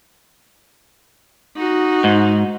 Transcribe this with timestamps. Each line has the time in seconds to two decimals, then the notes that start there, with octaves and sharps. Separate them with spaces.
1.57 D#4 F#4
2.04 G#2